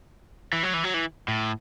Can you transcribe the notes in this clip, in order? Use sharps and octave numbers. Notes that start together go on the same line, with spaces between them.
E3
F#3
E3
F#3
E3
A2